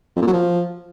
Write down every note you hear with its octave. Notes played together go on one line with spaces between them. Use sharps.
F2
A#2
F#3
F3